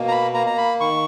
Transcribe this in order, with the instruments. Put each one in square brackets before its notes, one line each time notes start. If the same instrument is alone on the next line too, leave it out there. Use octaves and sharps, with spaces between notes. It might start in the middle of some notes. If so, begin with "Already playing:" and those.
Already playing: [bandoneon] B2 A#3
A#5
B5
A#3 A#5
A#5
B5
D#3 C#6